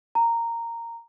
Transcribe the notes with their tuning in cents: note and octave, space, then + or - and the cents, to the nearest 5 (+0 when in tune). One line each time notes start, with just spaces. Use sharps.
A#5 -10